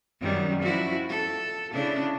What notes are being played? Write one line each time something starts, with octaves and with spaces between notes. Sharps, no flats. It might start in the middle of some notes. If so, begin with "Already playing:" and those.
F#2 D#3 G3
F3 E4 F#4
A4
C#3 D4 E4